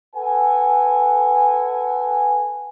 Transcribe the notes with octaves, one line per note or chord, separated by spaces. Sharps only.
A4 B4 F#5 G#5